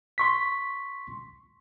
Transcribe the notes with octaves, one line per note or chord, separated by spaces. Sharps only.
C6 C#6 B6